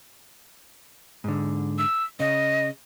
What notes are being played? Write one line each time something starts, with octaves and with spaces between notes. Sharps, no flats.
G#2 D3
E6
C#3 D#5